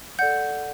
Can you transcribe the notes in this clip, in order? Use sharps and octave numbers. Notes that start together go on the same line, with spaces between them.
A4 D5 F#5 G6